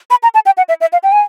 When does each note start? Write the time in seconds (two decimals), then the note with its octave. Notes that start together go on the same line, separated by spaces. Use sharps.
0.10 B5
0.23 A#5
0.34 A5
0.46 G5
0.57 F#5
0.69 E5
0.81 E5
0.93 F5
1.03 G5
1.12 G#5